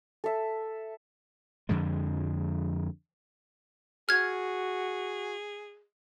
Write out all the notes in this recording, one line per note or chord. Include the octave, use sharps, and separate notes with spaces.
A4 E5
F2 D3 F3 G#3
F#4 G#4 F6 G#6